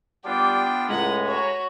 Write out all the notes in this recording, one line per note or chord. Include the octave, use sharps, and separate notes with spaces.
G3 B3 D4 F4 G5 D6
C#2 A2 G#3 F#5 G#5 A#5 B5
F#4 C#5